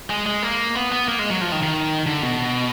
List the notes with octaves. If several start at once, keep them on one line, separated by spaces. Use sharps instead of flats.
G#3
G#3
A#3
B3
B3
A#3
G#3
F#3
F3
D#3
D#3
D3
B2